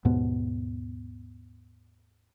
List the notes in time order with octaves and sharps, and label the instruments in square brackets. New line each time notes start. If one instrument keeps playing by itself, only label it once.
[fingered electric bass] D#2 G#2 B2 B3